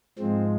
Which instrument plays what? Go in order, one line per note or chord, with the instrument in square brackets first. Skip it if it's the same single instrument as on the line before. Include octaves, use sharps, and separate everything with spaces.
[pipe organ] G#2 F3 G#3 C4